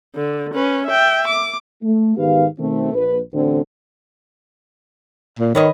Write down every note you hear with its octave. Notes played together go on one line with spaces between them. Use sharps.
D3
C#4 B4
E5 G5
D6
A3
G#2 D#3 B3 G4 B4 F5
B2 D#3 A3 C4
A#1 B4
A1 D2 D3 C4
A#2
D#3 B4 C#5 D#5